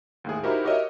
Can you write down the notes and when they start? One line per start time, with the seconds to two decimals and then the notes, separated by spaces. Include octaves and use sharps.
0.24 D#2 A2 G#4
0.43 D#4 E4 F#4 G4 A#4 C5
0.64 F#4 G4 A#4 C#5 D#5 E5